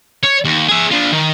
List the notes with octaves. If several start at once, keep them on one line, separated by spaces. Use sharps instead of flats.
C#5
D#2
G#4 E5
D4 F4
D#3